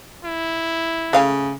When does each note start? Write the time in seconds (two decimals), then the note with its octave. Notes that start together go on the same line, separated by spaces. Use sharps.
0.25 E4
1.13 C#3 A3 F5 G#5